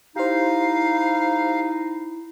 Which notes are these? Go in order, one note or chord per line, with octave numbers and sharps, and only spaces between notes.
D#4 E4 G4 C5 F5